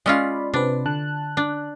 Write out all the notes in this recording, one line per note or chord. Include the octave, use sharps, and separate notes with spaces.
G#3 C#4 F4 D5 B5
C3 C4 D4 B4
D3 A5 F#6
D4